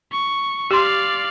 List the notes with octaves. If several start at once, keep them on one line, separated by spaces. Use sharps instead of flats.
C#6
G4 D5 F5 C6